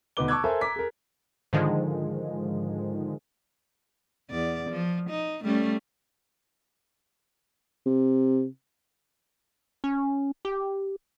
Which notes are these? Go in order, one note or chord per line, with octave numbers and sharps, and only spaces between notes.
D2 B2 D#4 B4 D6 G7
A5 C#6 D6 E6 F#6 G#6
A4 A#4 C5 E5 G#5
A#5 D6 B6
G#4 A#4
G#2 D3 D#3 F3 G#3
E2 D5
F3
D#4
G3 A3 C#4
C3
C#4
G4